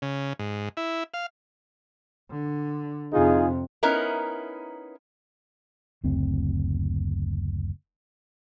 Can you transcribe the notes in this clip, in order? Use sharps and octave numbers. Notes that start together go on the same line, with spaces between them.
C#3
G#2
E4
F5
D3
F2 C3 D#4 F4 G#4
B3 C#4 D#4 E4 A#4
F#1 D2 C4